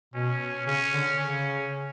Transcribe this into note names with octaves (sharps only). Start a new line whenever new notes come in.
B2 C#4
C#3 C#4
D3
C#3 C#4